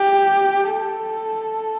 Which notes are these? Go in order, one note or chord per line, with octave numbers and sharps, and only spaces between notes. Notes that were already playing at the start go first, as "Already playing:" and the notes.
Already playing: G4
A4